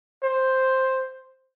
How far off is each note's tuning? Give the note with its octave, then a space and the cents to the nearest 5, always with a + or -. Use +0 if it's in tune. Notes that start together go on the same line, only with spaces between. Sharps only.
C5 +5